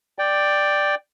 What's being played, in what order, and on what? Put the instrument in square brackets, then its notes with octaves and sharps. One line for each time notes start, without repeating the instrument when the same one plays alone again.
[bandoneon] D5 G5